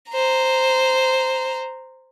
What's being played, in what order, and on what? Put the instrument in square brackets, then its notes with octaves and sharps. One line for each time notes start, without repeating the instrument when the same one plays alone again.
[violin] C5 A#5